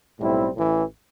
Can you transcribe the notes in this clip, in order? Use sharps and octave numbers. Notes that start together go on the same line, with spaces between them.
B1 A2 G3 C4 E4
A1 A2 E3